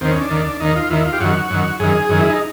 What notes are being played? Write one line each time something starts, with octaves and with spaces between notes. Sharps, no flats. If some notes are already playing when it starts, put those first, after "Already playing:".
D#2 D#3 C4
C#4
D4
D#2 D#3
D#2 D#3 D#4
F4
D#2 D#3 E4
F4
G4
F#2 D#3 F#4
F#2 D#3
F#2 D#3 G#4
F#2 D#3
E4
D#4